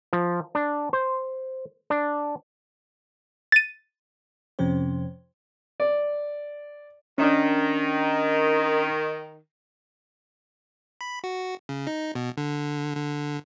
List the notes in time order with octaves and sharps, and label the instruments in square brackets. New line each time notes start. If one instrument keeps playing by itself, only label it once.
[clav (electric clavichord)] F3
D4
C5
D4
[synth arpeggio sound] A6 D#7
[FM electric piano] F2 C3 F3 C#4 C5
[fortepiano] D5
[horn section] D#3 [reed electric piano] C#4 D4
[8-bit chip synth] B5
F#4
C#3
D#4
B2
D3
D3